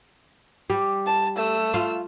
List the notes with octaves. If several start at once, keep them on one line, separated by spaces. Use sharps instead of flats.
G3
A5
A3 E6
F4